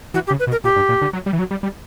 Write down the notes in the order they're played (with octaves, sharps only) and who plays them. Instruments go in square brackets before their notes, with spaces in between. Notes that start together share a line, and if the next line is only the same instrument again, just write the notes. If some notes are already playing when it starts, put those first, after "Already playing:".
[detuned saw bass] E3 [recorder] F#4
[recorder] G4
[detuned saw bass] C#3
[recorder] B4
[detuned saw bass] B2
[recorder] A#4
[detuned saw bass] A#2 [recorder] G4
[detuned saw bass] G2
A#2
D3
F#3
G3
E3
F#3
G3
G3